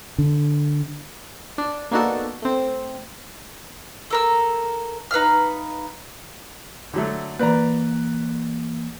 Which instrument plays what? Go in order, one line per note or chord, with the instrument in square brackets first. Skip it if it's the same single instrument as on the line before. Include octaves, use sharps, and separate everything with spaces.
[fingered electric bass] D3
[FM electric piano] D4
A#3 B3 D4 D#4 F#4 A4
A3 C4
[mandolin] A4 A#4 E6
D#4 B4 F5 F6
[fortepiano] D3 F#3 A3
[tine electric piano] E3 A#3 [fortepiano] B4 D5 A#5